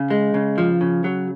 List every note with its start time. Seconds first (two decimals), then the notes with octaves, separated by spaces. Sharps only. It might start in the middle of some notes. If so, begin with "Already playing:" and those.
Already playing: C#3
0.10 G#3
0.34 C#3
0.58 F3
0.81 C#3
1.04 F#3